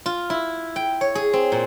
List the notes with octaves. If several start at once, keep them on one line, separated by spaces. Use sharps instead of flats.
F4
E4
G5
C#5
G#4
C4
A#2